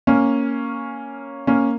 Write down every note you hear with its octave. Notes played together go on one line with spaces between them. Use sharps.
A#3 C#4
A#3 C#4